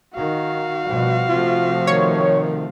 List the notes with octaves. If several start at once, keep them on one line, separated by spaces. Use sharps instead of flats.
D#3 F#4 F5
B2 F3 G3
C3 F3 A3 F4
D#3 C#5